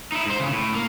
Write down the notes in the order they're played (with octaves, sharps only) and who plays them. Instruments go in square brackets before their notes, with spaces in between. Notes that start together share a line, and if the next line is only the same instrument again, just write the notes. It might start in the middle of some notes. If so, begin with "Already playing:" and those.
[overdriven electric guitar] D#4 E4
G#2 C5
C#3 E3
A2
A#3